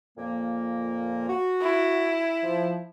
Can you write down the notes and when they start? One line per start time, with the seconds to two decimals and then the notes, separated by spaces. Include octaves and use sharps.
0.16 F2 A#2 A#3
1.28 F#4
1.61 E4
2.43 F3